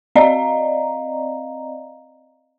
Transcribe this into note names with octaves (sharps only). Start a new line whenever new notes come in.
C4 D5 D#5 F5 A#5